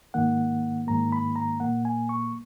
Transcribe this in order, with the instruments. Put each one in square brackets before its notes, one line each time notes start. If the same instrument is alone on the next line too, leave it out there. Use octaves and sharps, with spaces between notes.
[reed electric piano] G#2 D#3 A#3 F#5
G#2 D#3 A#3 A#5
B5
A#5
A#2 A#3 F#5
G#5
C#6